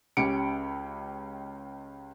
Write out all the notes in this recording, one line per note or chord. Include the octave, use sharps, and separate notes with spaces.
C#2 C#4 G4 C#7 D7